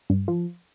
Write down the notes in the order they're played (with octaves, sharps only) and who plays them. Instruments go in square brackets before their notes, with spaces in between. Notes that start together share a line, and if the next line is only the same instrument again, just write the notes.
[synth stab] G2
F3